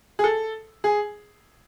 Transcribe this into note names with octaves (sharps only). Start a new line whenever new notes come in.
G#4
A4
G#4